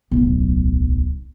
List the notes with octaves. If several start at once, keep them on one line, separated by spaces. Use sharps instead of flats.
D1 B1